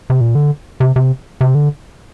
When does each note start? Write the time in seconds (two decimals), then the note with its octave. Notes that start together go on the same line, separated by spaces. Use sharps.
0.10 C3
0.21 A#2
0.35 D3
0.80 C3
0.96 C3
1.41 C3
1.55 D3